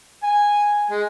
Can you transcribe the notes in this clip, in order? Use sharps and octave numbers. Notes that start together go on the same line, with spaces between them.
G#5
G#3